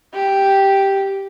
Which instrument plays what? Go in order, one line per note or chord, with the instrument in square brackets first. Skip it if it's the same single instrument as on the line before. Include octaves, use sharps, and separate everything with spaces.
[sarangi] G4